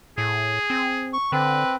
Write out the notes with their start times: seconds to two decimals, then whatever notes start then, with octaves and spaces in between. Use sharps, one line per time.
0.18 A2 G#4
0.70 C4
1.13 C#6
1.32 D3 C4 B4